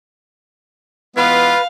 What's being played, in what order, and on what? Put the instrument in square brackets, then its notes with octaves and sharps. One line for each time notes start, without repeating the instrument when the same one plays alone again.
[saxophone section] E3 G#3 B3 [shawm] F4 [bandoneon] B4 [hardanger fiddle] F5